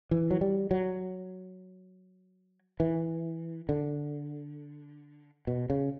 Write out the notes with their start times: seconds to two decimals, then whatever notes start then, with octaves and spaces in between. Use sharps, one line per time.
0.11 E3
0.31 F#3
0.41 G3
0.71 F#3
2.80 E3
3.69 D3
5.47 B2
5.70 C#3